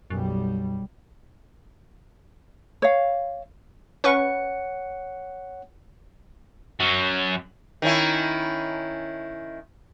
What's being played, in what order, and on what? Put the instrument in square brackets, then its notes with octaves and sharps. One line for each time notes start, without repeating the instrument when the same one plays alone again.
[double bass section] B1 G3 [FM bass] F#2
[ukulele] C#5 F5
[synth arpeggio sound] C#4 B4 C#6 [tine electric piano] C#5 F#5 C#7
[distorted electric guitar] F#2 F#3
[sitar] D#3 C#4 E4